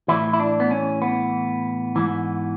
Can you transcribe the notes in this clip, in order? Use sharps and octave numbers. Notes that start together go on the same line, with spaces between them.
A2 E3 E4
E4
D4
B3
C#4
B3
G#2 E3